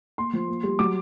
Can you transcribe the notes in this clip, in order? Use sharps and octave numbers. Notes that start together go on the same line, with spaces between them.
A#3 C6
F3
A#3
G3
F#3 D6